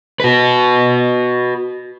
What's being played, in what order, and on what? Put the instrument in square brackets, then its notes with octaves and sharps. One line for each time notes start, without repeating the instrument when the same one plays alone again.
[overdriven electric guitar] F#4 B4